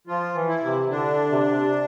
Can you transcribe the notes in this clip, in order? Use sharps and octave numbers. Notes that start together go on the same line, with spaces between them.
F3 F4
E3
E4
C3
D3 D4
C3
C3